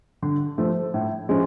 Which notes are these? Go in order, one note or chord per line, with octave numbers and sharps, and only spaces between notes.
D3
F3 A3
A2
F3 G#3 C#4